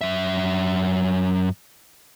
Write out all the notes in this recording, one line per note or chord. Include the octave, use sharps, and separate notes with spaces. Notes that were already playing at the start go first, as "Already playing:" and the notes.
F#2 E5